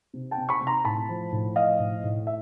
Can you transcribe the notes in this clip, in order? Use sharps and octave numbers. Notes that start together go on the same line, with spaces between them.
C3
G5 A5
C3
B5 C#6
C3
A#5 C6
A2 A5 B5
F3
A2
F3 D#5 F5
A2
A2
E5